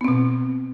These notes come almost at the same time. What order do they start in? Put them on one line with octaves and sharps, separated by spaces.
B3 C4 B2